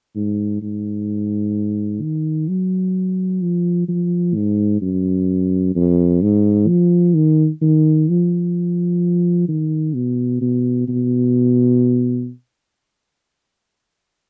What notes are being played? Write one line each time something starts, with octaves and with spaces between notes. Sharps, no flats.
G#2
G#2
D#3
F#3
F3
F3
G#2
F#2
F2
G#2
F3
D#3
D#3
F3
D#3
B2
B2
B2